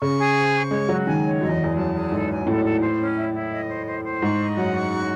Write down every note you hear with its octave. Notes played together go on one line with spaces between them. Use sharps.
C#3 C#6
G#4
C5
C#6
G#3 C#5
F#3 F#4
D#3 G#5
C#5
F#2 D#5
E2
E2 G#4
F#2 A5
G#4
G#2 A4
G#5
A2 A4
A4
C5
C#4
E4
E4
D#5
C5
C5
C5
G#2 C#6
D#5
F#2 F#5
C#6
F#4